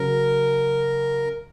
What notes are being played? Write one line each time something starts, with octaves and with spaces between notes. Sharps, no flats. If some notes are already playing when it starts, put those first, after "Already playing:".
Already playing: C#3 F#3 C#4 A#4